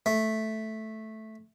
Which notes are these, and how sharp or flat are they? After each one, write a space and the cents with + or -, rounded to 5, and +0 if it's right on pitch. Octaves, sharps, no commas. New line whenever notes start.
A3 -5